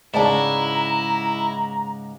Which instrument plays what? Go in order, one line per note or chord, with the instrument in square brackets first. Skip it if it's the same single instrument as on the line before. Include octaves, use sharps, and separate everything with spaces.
[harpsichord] C#2 G#2 [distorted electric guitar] E4 [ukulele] D5 A5 [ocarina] A#5